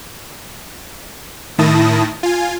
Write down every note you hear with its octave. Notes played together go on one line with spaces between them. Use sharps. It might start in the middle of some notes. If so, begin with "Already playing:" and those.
A2 D#3 E4 A5 D#6 A#6
F4 G#5